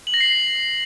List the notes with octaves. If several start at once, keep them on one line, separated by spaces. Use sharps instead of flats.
F#7
A#6
C7